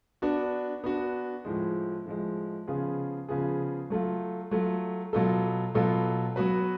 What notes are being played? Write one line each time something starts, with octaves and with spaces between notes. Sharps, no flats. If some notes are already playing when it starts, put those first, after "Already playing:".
B3 D4 F#4
B3 D4 F#4
A2 F3 G#3
A2 F3 G#3
C#3 F3 B3 F4 G#4
C#3 F3 B3 F4 G#4
F#3 A3 F4
F#3 A3 F4
B2 F#3 B3 F4 A4
B2 F#3 B3 F4 A4
F#3 B3 F#4 B4